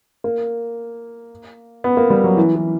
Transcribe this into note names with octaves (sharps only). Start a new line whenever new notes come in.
A#3
B3
A#3
G3
F#3
E3
E3